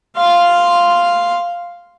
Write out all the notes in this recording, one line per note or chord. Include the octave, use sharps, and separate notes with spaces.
F5 C6